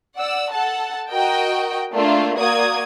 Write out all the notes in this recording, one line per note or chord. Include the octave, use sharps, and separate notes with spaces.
D5 F#5 E6
A4 F#5 A5
F#4 A#4 D#5 G5
A3 A#3 D4 F4
A#3 F#4 D5 D#6 G#6